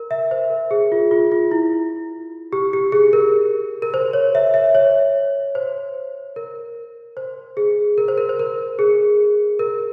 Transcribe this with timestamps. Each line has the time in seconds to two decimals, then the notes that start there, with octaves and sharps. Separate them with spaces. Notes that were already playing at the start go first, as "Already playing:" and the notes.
Already playing: A#4
0.11 E5
0.31 C5
0.50 A#4
0.71 G#4
0.92 F4
1.11 F4
1.32 F4
1.51 E4
2.53 G4
2.73 G4
2.92 G#4
3.13 A#4
3.82 A#4
3.94 C5
4.13 C#5
4.35 E5
4.54 E5
4.75 C#5
5.55 C5
6.36 A#4
7.17 C5
7.57 G#4
7.98 A#4
8.08 C5
8.18 A#4
8.29 C5
8.39 A#4
8.79 G#4
9.59 A#4